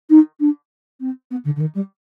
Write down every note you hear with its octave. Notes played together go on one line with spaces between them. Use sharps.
D#4
D4
C4
B3
D3
D3
D#3
G3